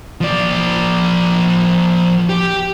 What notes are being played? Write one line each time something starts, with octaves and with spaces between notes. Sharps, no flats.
F3 D5
G4